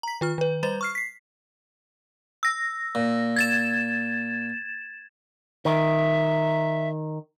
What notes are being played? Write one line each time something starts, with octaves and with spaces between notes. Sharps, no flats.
A#5 B6
D#3 F4 F6
D#3 B4
G3 B4 C5 A#5 A6 E7
C#6 F6 C7
B6 C7
E6 A#6
A#2
G#6 A6 E7
D#3 E5